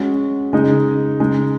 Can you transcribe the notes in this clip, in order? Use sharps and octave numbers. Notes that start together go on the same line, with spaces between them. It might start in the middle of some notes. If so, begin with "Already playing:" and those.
Already playing: G#3 C#4 F#4
C#3 G#3 D#4 G#4
C#3 G#3 D#4